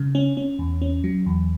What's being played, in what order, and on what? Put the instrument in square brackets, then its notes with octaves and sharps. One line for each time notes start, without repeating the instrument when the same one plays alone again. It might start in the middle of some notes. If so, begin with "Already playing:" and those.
Already playing: [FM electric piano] C#3
C#4
C#4
E2
C#4
F#3
E2